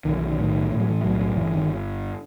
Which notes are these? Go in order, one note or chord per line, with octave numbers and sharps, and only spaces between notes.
B1 D#3
E3
D#3
A2 D#3
A2 E3
F#3
E3
B1 F#3
F#3
G1 E3
D#3